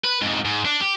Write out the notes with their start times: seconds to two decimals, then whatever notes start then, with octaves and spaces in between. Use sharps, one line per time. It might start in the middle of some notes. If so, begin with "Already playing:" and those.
0.04 B4
0.21 F2 G#2
0.45 G#2
0.65 D4
0.80 G4